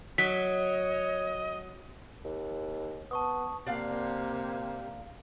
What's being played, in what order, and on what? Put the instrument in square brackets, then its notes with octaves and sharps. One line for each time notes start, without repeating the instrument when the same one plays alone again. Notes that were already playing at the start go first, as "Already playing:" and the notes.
[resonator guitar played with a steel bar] F#3 [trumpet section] C#5 [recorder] D#5 [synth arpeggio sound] B6
[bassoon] D#2
[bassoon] B3 [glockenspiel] A5 C#6 D#6
[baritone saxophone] C3 [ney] A#3 [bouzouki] D4 F5 F#5